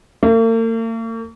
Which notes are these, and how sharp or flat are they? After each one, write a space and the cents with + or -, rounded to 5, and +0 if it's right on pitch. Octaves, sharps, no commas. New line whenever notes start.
A#3 -45